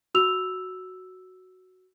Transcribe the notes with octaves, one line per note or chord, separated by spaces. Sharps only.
F#4 E6 F7